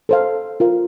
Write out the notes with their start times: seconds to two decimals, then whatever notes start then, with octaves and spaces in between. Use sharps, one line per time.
0.09 A4 C5 F5
0.60 F4 A#4 F5